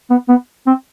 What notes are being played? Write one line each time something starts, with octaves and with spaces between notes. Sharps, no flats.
B3
B3
C4